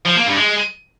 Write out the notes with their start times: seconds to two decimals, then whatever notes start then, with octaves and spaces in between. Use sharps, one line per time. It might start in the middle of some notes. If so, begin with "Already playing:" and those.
0.05 F3
0.16 A#3
0.26 G2
0.37 G#3